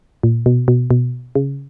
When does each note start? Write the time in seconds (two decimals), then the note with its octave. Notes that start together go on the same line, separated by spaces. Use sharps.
0.23 A#2
0.46 B2
0.68 B2
0.91 B2
1.35 C#3